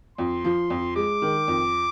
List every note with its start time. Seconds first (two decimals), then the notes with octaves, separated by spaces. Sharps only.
0.18 F2 C6
0.45 F3
0.70 F2
0.96 G#3 D6
1.22 D#3
1.48 F2